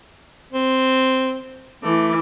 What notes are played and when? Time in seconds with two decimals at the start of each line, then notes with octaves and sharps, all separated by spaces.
0.53 C4
1.83 E3 A3 D6